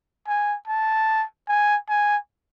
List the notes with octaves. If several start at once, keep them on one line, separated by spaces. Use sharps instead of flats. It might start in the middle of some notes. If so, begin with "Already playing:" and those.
G#5
A5
G#5
G#5